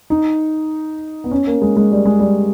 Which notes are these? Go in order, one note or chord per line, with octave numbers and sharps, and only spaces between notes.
D#4
B3
C#4
A#3
G#3
G#3
G3
G#3
G3